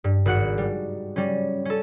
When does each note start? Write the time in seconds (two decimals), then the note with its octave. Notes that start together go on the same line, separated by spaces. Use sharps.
0.04 G2
0.25 G#1 F#4 F#5 F#6 C#7
0.58 G3
1.16 G3 C#4
1.65 C#4 A4